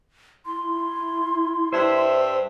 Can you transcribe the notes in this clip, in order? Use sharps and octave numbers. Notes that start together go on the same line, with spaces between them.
E4 C6
G2 C5 E5